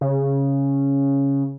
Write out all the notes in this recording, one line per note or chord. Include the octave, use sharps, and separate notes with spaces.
C#3